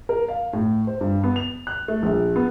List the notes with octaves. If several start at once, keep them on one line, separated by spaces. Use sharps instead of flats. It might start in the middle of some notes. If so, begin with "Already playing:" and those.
A#4
F5
A2
C5
G2
B3
F7
F#6
A3
A#1
B3